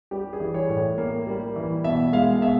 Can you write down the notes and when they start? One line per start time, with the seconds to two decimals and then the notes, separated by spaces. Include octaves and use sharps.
0.11 G3 G4
0.33 G#4
0.40 E3
0.54 C#5
0.69 A2
0.98 A#3
1.27 G3
1.56 E3
1.84 B2 E5
2.13 G#3 F5
2.42 B2 E5